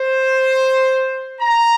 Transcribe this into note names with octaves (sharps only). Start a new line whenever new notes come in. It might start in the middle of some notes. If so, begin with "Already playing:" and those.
Already playing: C5
A#5